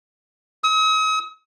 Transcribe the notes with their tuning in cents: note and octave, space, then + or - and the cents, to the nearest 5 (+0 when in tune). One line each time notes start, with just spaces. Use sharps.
D#6 +45